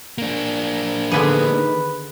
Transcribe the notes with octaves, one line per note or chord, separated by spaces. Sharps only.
A#3 D4
D3 D#3 B3 G#4 B4